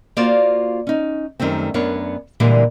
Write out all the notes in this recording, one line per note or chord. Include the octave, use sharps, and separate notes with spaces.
A#3 F4 F#4 C5 D5
C#4 D#4
F#2 D#3 G3 A3 C4
F#2 B3 D4 A#4 C#5
A#2 D3 E3 G3 G#3 A#3